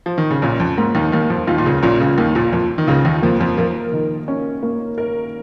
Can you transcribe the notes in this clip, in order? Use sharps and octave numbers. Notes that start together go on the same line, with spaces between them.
F3
D#3
C#3
A#1 A#2 C#4
F2
G#2 A#3
D#2 D#3
D#2 D#3 A#3
F2 F3
D#2 D#3 F4
A#2
C#2 C#3
A#1 A#2 C#4
C#2 C#3
D#2 D#3 A#3
A#1 A#2
F2 A#3
D#3
C#2 C#3 F4
D#2 D#3
F2 F3 A#3
F2 F3
F2 F3 A#4
D#3
C#4
A#3
A#4